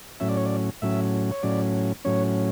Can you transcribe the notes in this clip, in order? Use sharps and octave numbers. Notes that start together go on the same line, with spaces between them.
A2 F#3 C#4 E5
D5
C#5
D5
A2 F#3 C#4 E5
C#5
A2 F#3 C#4 D5
A2 F#3 C#4 C#5